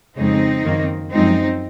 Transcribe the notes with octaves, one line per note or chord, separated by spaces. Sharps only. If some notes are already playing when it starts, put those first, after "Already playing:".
F2 C#3 G#3 C4 D#4
F#2 D#3 A#3
F#2 F3 G#3 C4 D#4